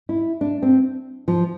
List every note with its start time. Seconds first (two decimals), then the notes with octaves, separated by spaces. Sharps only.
0.09 E4
0.41 D4
0.62 C4
1.28 F3